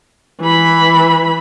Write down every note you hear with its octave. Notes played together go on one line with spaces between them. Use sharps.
E3 B5